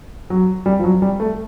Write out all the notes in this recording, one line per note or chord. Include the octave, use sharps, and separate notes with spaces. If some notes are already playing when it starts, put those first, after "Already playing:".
F#3
G3
F3
F#3
G3
A3